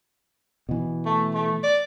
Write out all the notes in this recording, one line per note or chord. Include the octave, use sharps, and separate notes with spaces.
B2 E3
A3
A3
D5